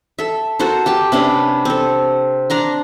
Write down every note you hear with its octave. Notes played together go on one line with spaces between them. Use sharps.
A4 E5
F#4 A4 A#4 C5
G4 G5 A5
C3 C#4 D4 B4
C4 A4
D4 A#5 C6